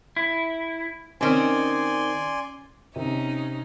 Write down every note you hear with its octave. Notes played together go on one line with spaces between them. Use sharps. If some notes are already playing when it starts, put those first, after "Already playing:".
E4
D#3 C4 C#4 D5 G#5 C6
C3 C#4 D#4